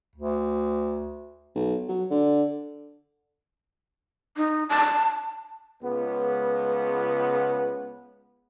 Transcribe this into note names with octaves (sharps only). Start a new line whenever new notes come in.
D2
B1
F#3
D3
D#4
A5
C#2 B3